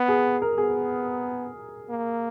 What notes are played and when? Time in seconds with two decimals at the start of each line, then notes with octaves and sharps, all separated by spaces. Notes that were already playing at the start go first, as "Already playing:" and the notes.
Already playing: B3
0.08 G#4
0.42 A#4
0.58 B3 G#4
1.89 A#3